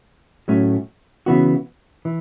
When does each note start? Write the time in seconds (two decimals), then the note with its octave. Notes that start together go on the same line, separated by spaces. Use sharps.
0.48 A2 F#3 A3 C#4
1.26 C#3 E3 B3 F#4
2.05 E3